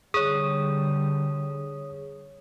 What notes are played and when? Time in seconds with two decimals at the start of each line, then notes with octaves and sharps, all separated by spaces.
0.14 D3 G3 G#4 C#5 D#6